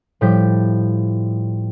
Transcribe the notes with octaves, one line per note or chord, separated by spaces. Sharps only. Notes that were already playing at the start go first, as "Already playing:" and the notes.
A2 F3 G3 G6 B6